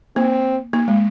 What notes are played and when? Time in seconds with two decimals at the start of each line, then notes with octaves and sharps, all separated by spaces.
0.16 A#3 C4
0.73 A#3
0.88 G#3